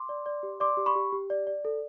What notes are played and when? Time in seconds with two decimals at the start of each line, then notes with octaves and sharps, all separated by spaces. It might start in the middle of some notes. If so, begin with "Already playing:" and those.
Already playing: C6 D6
0.09 D5
0.26 D5
0.43 G4
0.60 D5 C6 D6
0.77 G4
0.86 B5 C#6
0.96 G4
1.13 G4
1.30 D5
1.47 D5
1.65 A4